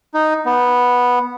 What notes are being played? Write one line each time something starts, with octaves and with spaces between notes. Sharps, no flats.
D#4
B3